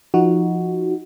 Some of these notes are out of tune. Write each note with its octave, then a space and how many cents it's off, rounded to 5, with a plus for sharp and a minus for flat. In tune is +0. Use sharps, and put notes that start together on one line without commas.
F3 -5 D#4 +15 F#4 +0